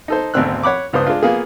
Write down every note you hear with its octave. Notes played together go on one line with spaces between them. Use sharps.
D#4 A4 C5
G#1 D2 B2 C4 E6 F#6
C#5 F#5 B5 D6
C#2 G2 B3 C5 D#6
G#3 D4 F4
A#3 B3 F4 G#4